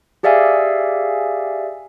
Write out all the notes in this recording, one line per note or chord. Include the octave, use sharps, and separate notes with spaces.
G4 G#4 D5 E5 F5 G#5